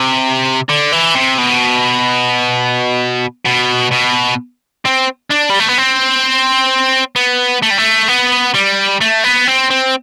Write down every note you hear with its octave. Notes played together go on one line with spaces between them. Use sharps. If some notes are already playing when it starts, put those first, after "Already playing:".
Already playing: C3
D3
E3
C3
B2
B2
B2
C4
D4
G3
A3
B3
C4
B3
A3
G3
A3
B3
G3
A3
B3
C4
C4